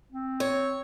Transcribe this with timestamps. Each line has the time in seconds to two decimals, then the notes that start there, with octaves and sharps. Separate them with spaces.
0.12 C4
0.40 C#5